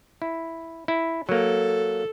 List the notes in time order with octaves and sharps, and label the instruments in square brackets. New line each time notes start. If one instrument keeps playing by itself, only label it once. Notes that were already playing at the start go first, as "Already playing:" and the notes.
[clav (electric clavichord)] E4
E4
[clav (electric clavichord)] F#3 A#3 [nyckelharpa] A4